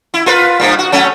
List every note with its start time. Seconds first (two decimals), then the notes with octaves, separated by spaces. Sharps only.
0.14 E4
0.26 F4 A#4 B4
0.60 G2 A#2
0.79 F#4
0.92 F#3 A3 C#4